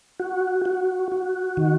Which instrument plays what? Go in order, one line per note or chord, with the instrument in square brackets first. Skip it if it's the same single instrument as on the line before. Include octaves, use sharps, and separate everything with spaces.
[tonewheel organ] F#4
F#4
F#4
D#3